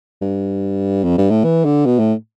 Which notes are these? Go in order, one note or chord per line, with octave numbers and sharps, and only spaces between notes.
G2
F2
G2
A2
E3
D3
B2
A2